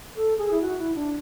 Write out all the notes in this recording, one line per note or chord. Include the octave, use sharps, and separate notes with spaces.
A4
G#4
E4
F#4
E4
D4